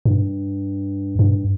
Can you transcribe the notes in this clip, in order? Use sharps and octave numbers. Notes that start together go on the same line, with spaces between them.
G2
G2